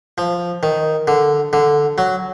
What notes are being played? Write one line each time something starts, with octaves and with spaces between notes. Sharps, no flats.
F3
D#3
D3
D3
F#3